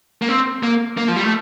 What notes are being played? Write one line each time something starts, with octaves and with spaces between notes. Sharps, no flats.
A#3
C4
A#3
A#3
F3
G3
A3